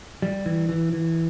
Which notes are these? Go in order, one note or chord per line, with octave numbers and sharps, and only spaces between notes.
G3
E3
E3
E3